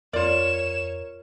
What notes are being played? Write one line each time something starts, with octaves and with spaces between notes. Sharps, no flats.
F2 F4 A#4 C#5 D5 E7